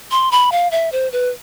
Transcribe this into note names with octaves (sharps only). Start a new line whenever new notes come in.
C6
B5
F5
E5
C5
B4